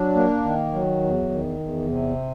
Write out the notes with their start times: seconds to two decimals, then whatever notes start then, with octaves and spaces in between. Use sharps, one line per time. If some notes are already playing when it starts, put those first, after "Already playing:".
Already playing: F#3 D4
0.15 A#3
0.45 D#3
0.73 F#3
1.03 E2
1.31 D#3
1.59 E2
1.89 C3